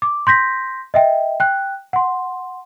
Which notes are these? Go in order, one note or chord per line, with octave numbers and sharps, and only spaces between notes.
D6
C6 G6 A#6 B6
D#5 E5 G5
G5 F#6
F#5 C6